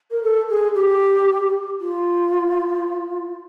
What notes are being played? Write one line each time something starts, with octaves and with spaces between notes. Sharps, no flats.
A#4
A4
G#4
G4
F4